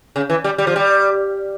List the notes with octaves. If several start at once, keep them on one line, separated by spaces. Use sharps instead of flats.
C#3
E3
G3
G3
F3
G3